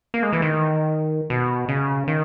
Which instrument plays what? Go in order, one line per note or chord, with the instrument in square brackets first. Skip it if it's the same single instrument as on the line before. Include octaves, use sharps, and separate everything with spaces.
[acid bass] A#3
G#3
E3
D#3
B2
C#3
D#3